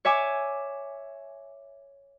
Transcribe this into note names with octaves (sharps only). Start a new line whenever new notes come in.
C#5 E5 G#5 D6